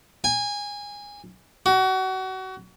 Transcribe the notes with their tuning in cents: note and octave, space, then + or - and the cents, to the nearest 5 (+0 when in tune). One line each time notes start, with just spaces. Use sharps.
G#5 -20
F#4 +30